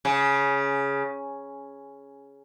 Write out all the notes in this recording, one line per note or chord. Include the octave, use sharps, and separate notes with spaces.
C#3